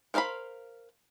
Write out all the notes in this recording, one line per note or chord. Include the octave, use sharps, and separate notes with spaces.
A#4 C5 F5 A#5 B5